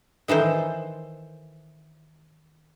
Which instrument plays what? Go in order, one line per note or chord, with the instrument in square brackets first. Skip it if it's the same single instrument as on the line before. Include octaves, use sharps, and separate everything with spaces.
[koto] D#3 E3 A4 C5